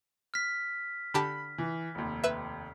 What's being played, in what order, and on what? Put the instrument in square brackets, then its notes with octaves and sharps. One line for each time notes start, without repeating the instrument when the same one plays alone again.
[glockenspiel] F6 B6
[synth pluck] D3 G4 A5 [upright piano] B5
[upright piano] E3
F1 D#2
[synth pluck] B4 E5